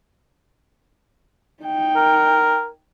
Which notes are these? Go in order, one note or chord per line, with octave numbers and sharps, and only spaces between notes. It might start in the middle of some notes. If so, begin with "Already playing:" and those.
D#4 G5
A#4